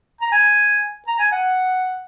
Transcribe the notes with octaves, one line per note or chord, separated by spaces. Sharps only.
A#5
G#5
A#5
G#5
F#5